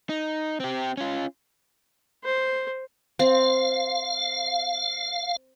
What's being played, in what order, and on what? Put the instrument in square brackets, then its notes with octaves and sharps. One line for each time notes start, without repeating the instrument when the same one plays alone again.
[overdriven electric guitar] D#4
C4 G4
C#4 F4
[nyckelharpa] C5
[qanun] C4 [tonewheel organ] F5